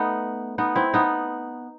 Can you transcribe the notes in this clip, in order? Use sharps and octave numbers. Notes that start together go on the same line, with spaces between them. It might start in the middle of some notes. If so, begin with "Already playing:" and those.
Already playing: A3 B3 D#4
B3 D#4
C4 E4
B3 D#4